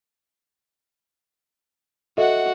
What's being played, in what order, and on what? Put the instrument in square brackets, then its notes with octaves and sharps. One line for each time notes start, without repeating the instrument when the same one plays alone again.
[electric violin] F#4 F#5 [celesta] A4 D#5 E5